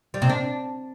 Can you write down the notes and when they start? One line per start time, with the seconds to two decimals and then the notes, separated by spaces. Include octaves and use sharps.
0.14 G3
0.22 C3
0.29 D4